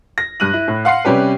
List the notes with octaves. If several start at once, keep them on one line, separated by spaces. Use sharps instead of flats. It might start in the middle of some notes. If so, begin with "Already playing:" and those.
A#6
G2 F#6 D#7 F#7
E4
A2
F5 F#5 C6 C7
C3 G3 C#4 G4 B4